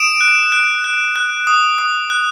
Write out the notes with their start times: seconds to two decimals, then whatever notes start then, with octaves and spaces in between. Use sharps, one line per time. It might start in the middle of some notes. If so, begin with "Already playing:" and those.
Already playing: D#6 D7 E7
0.21 F#6
0.52 F#6
0.84 F#6
1.16 F#6
1.47 D#6
1.78 D#6
2.10 F#6